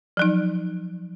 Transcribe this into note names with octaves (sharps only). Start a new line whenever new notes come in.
F3 F#3 D#4